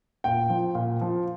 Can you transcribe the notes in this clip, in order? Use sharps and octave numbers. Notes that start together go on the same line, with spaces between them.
A#2 G5
F3
A#2
F3